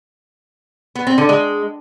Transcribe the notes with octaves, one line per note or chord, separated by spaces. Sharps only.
B3
C4
D3
G#3